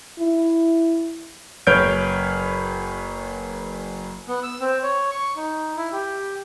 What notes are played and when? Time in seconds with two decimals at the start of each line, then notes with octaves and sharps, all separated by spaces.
0.19 E4
1.67 F#1 B4 C#5 F6 G6 D7
4.28 B3
4.43 E6
4.60 C4
4.83 C#5
5.11 C#6
5.36 D#4
5.77 E4
5.92 G4